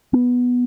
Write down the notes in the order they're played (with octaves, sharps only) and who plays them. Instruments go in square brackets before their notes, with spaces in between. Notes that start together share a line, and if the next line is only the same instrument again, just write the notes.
[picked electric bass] B3